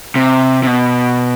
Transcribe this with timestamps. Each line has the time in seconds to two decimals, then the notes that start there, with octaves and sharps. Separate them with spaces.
0.16 C3
0.63 C3
0.67 B2